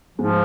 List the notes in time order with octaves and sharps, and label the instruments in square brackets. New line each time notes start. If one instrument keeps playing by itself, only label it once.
[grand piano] G#2 G#3 [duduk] F3